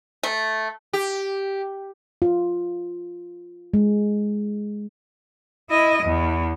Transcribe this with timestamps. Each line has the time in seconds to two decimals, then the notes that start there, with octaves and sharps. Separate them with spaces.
0.23 A3
0.93 G4
2.22 F4
3.74 G#3
5.70 E4 D#5
6.03 E2